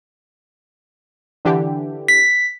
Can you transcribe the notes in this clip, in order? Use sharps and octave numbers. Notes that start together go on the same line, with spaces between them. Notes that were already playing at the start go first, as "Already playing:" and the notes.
D3 E3 G4
B6